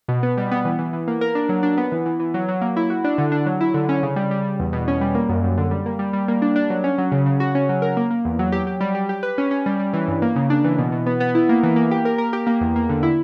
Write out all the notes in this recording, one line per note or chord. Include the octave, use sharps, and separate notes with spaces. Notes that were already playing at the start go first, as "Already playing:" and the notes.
B2
B3
G3
B3
E3
E3
E3
A#3
A#4
D4
F#3
D4
B3
E3
E3
E3
F#3
F#3
A#3
E4
F#4
D4
D3
D4
F#3
E4
D3
C#4
C#3
G3
G3
G3
E2
B2
C#4
G3
A#3
F#2
F#2
D3
G3
A#3
G3
G3
A#3
D4
D4
F#3
C#4
F#3
C#3
C#3
F#4
C#4
F#3
A#4
A#3
A#3
E2
F#3
G4
G4
G3
G4
G4
B4
C#4
C#4
G3
G3
E3
G2
A#3
C#3
D4
E3
B2
B2
B3
B3
E4
A#3
E3
A#3
G4
A#4
A#4
G4
A#3
E2
A#3
D3
E4